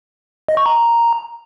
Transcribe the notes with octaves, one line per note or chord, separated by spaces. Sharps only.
D#5
C#6
A#5